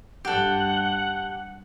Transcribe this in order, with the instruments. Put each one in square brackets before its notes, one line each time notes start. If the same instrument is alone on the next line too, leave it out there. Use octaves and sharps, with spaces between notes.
[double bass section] G2 [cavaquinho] G4 A4 [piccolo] F#5